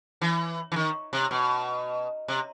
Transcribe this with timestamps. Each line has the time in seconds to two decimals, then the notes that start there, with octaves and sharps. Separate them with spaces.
0.22 E3
0.72 E3
0.76 D#3
1.13 C3
1.31 B2
2.28 C3